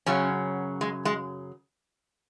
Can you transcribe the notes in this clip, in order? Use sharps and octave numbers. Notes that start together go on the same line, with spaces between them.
F#2 C#3 F#3 C#4
G#3
G#3